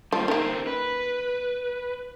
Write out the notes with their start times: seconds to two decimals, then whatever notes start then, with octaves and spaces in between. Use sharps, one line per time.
0.12 F3 G3 A#3
0.28 D#3 A#3 C#4 G4 C5
0.67 B4